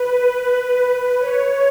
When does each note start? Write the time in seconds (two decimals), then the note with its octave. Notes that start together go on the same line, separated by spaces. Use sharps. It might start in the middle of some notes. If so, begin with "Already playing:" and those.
Already playing: B4
0.42 B4
1.18 C#5